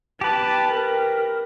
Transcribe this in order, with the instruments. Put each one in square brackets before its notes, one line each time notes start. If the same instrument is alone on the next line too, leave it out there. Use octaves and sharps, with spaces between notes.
[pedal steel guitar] G4 B4 [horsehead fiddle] A5
[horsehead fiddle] A#4